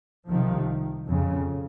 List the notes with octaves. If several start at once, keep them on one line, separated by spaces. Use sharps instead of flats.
C2 C3 D#3 F3
F2 C#3